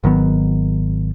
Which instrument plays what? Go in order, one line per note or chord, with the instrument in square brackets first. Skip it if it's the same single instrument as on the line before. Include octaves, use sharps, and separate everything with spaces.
[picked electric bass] G#1 D#3 F#3 B3